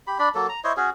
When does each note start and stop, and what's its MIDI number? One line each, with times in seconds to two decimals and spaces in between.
0.07 0.18 67
0.07 0.18 83
0.19 0.29 62
0.19 0.29 74
0.19 0.29 83
0.35 0.47 54
0.35 0.47 58
0.35 0.47 69
0.49 0.60 82
0.64 0.73 64
0.64 0.73 72
0.64 0.73 73
0.64 0.73 75
0.77 0.90 61
0.77 0.90 66
0.77 0.90 68